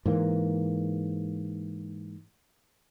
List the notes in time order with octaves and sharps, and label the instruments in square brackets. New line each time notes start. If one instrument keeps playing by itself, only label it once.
[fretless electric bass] G#2 E3 A#3